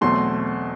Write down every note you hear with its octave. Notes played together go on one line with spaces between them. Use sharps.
E2 B2 F#3 A3 C4 C6